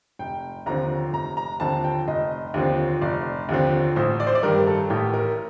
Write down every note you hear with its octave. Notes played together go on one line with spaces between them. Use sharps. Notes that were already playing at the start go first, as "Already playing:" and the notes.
F1 G5
D#2 D3 F3 C4 A#5
F1 A#5
A#5
D#2 D3 F3 C4 A5
G5
F1 D#5
D#2 D3 F3 C4
F1 D5
D#2 D3 F3 C4
A1 C5
D5
C5
D5
G2 D#3 G3 A#4
A4
A1 G4
A#4